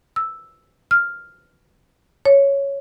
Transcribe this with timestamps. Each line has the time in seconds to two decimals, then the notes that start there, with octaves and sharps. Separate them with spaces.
0.16 E6
0.91 F6
2.25 C#5